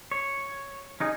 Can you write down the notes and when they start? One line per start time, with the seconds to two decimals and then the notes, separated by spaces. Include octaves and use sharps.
0.11 C#5
1.00 C#4 D#4 G#4